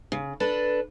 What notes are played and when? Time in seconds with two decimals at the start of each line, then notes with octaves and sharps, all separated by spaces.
0.12 C#3
0.40 D4 A4 B4